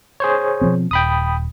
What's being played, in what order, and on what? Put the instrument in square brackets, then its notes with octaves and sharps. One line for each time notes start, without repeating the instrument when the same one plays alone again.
[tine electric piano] G#4 C5 C#5
[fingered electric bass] B2 F3 C4
[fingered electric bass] D#1 [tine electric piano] G5 B5 D#6